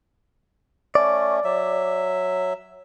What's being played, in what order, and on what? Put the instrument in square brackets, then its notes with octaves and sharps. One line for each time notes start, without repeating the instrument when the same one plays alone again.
[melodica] A3 C#4 [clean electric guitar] D5
[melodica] F#3 E5